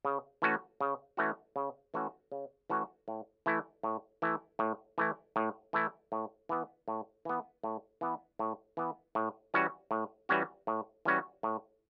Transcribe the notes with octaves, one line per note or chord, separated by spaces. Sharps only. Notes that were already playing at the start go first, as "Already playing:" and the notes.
C#3
E3 A3 C#4 F#4
C#3
E3 A3 C#4 F#4
C#3
E3 A3 C#4 F#4
C#3
E3 A3 C#4 F#4
A2
E3 A3 E4
A2
E3 A3 E4
A2
E3 A3 E4
A2
E3 A3 E4
A2
E3 B3
A2
E3 B3
A2
E3 B3
A2
E3 B3
A2
E3 G3 C#4 F#4
A2
E3 G3 C#4 F#4
A2
E3 G3 C#4 F#4
A2